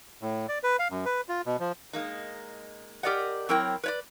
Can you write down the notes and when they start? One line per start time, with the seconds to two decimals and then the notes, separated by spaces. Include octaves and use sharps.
0.22 A2
0.49 D5
0.63 B4
0.79 F5
0.90 F#2
1.05 B4
1.29 F4
1.46 B2
1.60 F3
1.93 G#3 A#3 D#4
3.03 G4 A#4 D5 D#5 F#5
3.49 F#3 C4 E4 A#4 C#5 G5
3.83 B4 C#5 D5